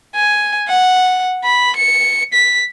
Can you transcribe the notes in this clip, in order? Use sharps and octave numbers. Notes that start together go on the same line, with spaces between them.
G#5
F#5
B5
C#7
B6